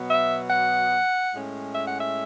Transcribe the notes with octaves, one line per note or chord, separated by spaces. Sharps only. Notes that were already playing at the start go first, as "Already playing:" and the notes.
Already playing: B2 F#3 B3
E5
F#5
A2 G#3 C#4
E5
F#5
E5